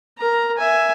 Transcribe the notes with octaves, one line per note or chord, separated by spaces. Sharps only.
A#4 A#5
E5 G#5